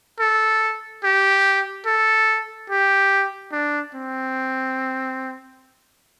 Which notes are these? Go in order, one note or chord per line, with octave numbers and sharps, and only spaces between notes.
A4
G4
A4
G4
D4
C4